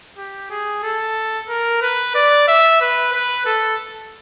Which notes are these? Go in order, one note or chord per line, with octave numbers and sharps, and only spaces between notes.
G4
G#4
A4
A#4
B4
D5
E5
B4
B4
A4